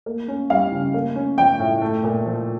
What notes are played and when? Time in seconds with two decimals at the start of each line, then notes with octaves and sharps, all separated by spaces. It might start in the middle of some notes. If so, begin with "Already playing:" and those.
0.06 A#3
0.28 C#4
0.50 G3 F5
0.72 C#3
0.94 A#3
1.15 C#4
1.38 F3 G5
1.59 A2
1.82 A3
2.04 A#2
2.26 F3